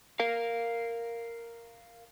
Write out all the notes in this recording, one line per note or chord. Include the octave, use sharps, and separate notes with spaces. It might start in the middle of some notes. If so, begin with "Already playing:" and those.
A#4 F5